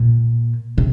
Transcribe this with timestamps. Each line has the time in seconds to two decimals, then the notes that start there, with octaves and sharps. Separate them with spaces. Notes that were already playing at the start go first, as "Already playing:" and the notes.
Already playing: A#2
0.78 C3